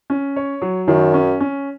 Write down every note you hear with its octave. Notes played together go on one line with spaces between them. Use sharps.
C#4
C#5
F#3
F#2 D#3
C#4
C#4